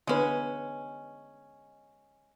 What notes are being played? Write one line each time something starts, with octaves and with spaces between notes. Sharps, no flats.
D3 G#3 B3 C#4 B4